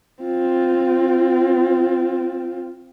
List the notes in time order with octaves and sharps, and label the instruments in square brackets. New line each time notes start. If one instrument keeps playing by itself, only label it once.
[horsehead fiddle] C4 F4